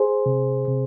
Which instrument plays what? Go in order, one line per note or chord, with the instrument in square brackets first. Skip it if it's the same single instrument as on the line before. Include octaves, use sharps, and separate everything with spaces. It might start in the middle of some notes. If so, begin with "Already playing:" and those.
Already playing: [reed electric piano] G#4 C5
C3
C3